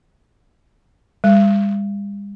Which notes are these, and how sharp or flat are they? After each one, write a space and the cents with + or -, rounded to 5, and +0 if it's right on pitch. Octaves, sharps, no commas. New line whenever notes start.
G3 +45